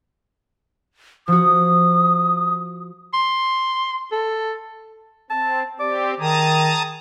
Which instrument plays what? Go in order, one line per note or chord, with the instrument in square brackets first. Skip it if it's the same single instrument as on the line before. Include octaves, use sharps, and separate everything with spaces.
[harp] F3 F#4 [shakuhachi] D#6
[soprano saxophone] C6
A4
[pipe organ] C4 [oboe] A5
[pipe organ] C4 G4 [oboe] D5
[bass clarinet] D#3 [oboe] G#4 [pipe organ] A5 A#5 D#6